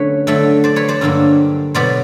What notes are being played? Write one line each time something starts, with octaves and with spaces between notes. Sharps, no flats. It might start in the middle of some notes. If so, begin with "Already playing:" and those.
Already playing: D3 F#3 A3 C#4 B4 C#5
D3 F#3 A3
C5 D5
B4 C#5
C5 D5
G2 D3 F#3 A#3
B2 F#3 B3 C5 D5